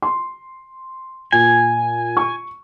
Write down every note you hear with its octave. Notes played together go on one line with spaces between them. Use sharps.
C6
A#2 G#5
C#6